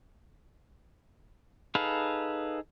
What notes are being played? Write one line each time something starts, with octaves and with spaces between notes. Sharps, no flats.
D#4 G#4 A4 B4 F5